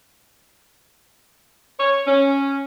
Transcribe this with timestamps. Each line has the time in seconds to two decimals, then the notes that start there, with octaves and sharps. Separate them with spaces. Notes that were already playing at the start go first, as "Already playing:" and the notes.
1.78 C#5
2.05 C#4